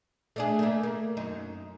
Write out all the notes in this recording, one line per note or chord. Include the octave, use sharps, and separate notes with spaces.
A3 D4 G#4
A3 A#3
A#3
F#2 D#4